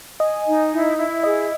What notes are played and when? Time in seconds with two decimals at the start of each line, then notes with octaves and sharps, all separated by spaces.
0.20 D#5 G#5
0.47 D#4
0.72 E4
0.98 E4
1.24 G#4 D#5